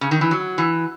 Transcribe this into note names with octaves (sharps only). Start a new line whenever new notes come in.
C#3
D#3
E3
F#3
E3